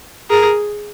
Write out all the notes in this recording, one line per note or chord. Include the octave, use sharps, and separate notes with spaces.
G#4 A#4